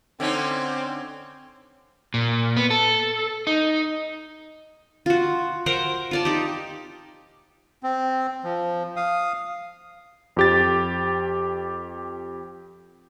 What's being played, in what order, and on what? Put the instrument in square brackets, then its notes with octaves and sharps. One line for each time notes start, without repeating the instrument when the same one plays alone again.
[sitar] D3 C#4 D#4 [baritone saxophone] C4
[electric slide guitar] A#2
B3
A4
D#4
[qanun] F4 F#4
A#4 C5 F#5 G5
F4 D5 A5
D#4 G4
[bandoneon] C4
F3
F5 D#6
[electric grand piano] F2 G4 A6